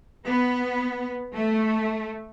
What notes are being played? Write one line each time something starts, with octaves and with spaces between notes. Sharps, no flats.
B3
A3